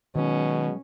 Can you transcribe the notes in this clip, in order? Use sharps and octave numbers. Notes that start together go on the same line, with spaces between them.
B2 D#3 F#3 G#3 C#4